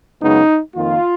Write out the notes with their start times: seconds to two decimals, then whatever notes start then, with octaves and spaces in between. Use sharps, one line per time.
0.21 F#2 C#3 G#3 B3 D#4
0.76 F2 D#3 A#3 F4